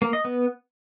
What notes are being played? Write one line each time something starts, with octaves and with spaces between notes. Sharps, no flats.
A#3
D#5
B3